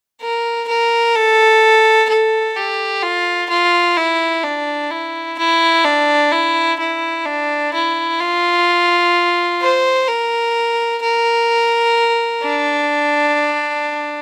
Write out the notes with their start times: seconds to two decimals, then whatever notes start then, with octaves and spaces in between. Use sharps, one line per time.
0.21 A#4
0.68 A#4
1.15 A4
2.09 A4
2.56 G4
3.02 F4
3.49 F4
3.97 E4
4.43 D4
4.91 E4
5.38 E4
5.85 D4
6.32 E4
6.79 E4
7.26 D4
7.73 E4
8.20 F4
9.61 C5
10.08 A#4
11.02 A#4
12.43 D4